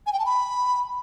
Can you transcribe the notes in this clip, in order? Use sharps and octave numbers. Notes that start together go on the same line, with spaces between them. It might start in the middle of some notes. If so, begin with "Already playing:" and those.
G#5
G5
A5
B5